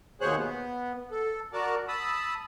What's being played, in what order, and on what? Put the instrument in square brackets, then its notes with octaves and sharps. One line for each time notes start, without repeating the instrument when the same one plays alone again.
[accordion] D#2 B2 G#4 C5 C#5 F#6
B3
A4
F#4 A#4 D5 A5
A5 B5 D#6 E6